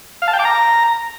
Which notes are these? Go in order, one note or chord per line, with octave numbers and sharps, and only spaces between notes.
F5
A5
G5
D6
A#5